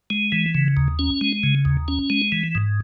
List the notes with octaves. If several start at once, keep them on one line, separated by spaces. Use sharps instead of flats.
G#3
E3
C#3
D#2
C#4
G#3
C#3
D#2
C#4
G#3
E3
G#2